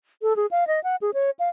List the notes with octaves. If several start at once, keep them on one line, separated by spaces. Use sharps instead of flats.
A4
G#4
F5
D#5
F#5
G#4
C#5
F5